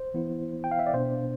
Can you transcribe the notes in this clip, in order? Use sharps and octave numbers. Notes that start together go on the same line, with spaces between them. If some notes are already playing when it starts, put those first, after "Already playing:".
Already playing: C5
E3 B3 E4
G5
F5
E5
D5
B2 B3 D4 C5